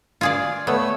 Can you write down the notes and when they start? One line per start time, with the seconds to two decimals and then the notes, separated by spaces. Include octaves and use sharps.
0.21 F4 G#4 D5
0.67 A3 B3 C#5 E6